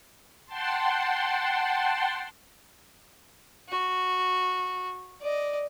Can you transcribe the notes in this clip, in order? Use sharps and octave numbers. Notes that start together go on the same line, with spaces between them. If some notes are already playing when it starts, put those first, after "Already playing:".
F#5 G5 A5 C6
F#4
D5 D#5